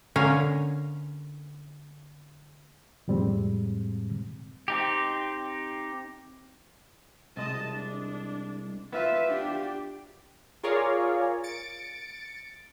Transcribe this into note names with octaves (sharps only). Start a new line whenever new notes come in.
D3 A#3 C#4 C#5 F5
F2 A2 G3 G#3 C4
C4 D#4 G4
C2 G#3 D#5 A5
D4
B3 F4 B4 C5 E5
D4 G4
F4 G#4 A#4 C#5 D5 F5
A6 C#7 D7